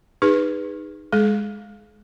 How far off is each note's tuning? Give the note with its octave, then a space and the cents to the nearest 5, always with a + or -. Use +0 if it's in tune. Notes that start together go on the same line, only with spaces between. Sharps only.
D#4 -10 G#4 -30 B4 +0
G#3 +0 G#4 +45